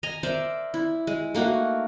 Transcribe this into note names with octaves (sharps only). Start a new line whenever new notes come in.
D#5 G#5 A#5
A#4 C5 D5 E5
E4
G#3
A3 A#3 D#4 F#4